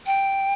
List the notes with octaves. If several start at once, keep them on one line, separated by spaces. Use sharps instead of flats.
G5